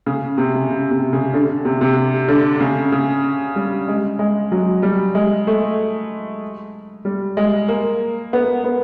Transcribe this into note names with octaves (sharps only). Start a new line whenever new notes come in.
C#3
C3
C#3
C#3
C3
C#3
D3
C3
C3
D3
C#3
C#3
G3
G#3
G#3
F#3
G3
G#3
A3
G3
G#3
A#3
B3
B3